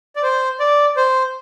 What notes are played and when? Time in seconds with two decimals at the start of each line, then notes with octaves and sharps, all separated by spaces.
0.16 D5
0.23 C5
0.60 D5
0.97 C5